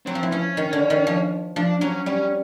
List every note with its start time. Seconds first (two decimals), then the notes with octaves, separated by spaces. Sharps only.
0.06 F#3 C4
0.15 F3
0.23 E3
0.31 F3 C#4
0.57 D#3
0.73 D3
0.90 D#3
1.07 F3
1.56 F3 D4
1.81 F#3 C#4
2.06 G3 C#4